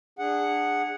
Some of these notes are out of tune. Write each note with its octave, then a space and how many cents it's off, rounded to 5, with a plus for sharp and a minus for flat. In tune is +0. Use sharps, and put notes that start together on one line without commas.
D4 +10 G#4 -15 F#5 +0